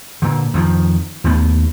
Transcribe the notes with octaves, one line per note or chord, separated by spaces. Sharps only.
A#2 D3
F2 D#3 F3
D#2 A3 B3